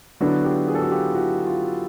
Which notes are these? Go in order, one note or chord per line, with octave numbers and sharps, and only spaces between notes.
D3 F#3 B3 D4 E4 F#4
F4 G4
G#4
A4
F#4 G#4
F4 G4
E4 F#4
F4